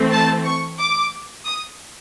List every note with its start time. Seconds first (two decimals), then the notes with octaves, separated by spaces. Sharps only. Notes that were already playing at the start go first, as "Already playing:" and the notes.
Already playing: E3 A3 C4
0.12 A5
0.45 C#6
0.79 D6
1.45 D#6